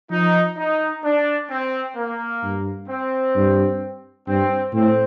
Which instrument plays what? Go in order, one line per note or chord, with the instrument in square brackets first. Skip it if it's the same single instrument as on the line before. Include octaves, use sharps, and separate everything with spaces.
[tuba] F3 [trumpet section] D#4
[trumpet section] D#4
D4
C4
A#3
[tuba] G2
[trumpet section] C4
[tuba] G2
[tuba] G2 [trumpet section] C4
[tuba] A2 [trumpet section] C4